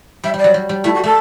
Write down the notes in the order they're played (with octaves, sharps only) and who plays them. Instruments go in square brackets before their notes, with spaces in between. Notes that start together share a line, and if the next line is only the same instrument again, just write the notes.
[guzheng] G3 [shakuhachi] E5
[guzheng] G3 [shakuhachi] D5
[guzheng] F#3
G3
G3
[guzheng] A3 [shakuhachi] E4
[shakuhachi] F#4
[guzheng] A3 [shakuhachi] A4